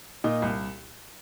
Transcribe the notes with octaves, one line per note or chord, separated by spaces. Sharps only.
A#2 D#4
C2